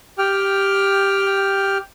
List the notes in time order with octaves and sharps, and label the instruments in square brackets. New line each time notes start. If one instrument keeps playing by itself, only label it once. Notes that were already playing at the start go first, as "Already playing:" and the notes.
[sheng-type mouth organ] G4 G5 F6